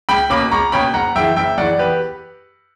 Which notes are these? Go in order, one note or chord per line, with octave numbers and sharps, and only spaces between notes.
C#2 G5 B5
B2 A#3 C#4 B5 D6
C#2 A#5 C#6
B2 A#3 C#4 G5 B5
F#1 F#5 A#5
F#2 C#3 E3 E5 G5
F#1 E5 G5
F#2 C#3 E3 D5 F#5
E2 G4 B4